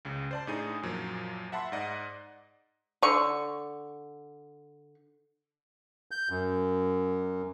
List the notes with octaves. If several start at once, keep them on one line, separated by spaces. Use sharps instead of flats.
C#2 C#3
C5 D5 A5
A2 D4 D#4 G#4 G#5 D#6
F#2 A#2 F3 F#3
E5 F#5 A5 B5 C6
G#2 D5 D#5 F#5
D3 C#6
G6
F#2